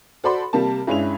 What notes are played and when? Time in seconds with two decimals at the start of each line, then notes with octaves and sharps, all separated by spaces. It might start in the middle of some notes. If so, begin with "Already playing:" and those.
0.24 F#4 A4 C5 D5 B5 C6
0.53 C3 G3 A#3 A5
0.87 G2 G#3 C#4 E4 F7